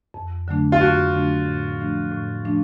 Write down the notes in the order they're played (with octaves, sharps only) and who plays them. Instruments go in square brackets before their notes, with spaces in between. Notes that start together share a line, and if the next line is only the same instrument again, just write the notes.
[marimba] F2
D3 F#3 A3 D4
[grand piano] F4
[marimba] F2 [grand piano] F#4
[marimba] D3 F#3 A3 D4
A2
F3 A3 D4
A2
F3 A3 D4